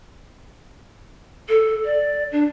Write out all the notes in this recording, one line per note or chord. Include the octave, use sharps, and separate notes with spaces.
A4
D5
D4